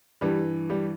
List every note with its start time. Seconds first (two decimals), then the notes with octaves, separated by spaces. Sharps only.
0.21 G2 E3 G3 G4
0.70 G3 G4